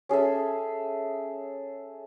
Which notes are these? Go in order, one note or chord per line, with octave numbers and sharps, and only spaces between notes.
C#4 G#4 A4 E5